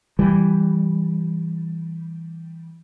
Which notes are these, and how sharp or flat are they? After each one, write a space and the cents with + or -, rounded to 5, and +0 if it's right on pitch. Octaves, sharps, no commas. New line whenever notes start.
E3 +0 G3 +0